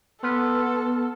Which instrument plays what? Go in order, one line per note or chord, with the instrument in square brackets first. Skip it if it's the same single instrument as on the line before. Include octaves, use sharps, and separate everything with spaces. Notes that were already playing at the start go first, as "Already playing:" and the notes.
[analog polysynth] B3 [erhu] A4 [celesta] B4 C6 F6